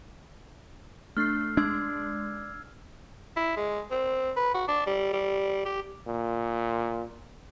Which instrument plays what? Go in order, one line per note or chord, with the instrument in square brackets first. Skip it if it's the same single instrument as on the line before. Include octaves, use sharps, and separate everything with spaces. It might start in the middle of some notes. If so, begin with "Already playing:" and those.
[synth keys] A3 D4 [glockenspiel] F6 C7
[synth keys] G#3 [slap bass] D4 [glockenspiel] E6 G#6
[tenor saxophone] E4
G#3
C4
B4
F#4
D4
G3
G3
G4
[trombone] A#2